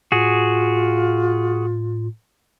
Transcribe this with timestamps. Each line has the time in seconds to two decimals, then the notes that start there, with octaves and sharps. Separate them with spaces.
0.12 A2 F4 F#4 G#4